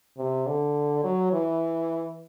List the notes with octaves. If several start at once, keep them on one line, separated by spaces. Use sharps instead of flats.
C3
D3
F#3
E3